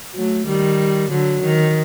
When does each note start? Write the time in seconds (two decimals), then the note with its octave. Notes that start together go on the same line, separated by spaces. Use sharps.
0.15 F#3 A3
0.47 D#3 G3
1.11 D3 F#3
1.43 D#3